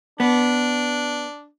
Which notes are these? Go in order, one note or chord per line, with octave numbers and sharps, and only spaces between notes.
B3 D4